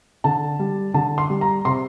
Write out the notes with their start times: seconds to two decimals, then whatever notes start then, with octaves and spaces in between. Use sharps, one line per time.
0.24 D3 A5
0.59 G3
0.94 D3 A5
1.18 C6
1.30 G3
1.41 A#5
1.65 C3 C6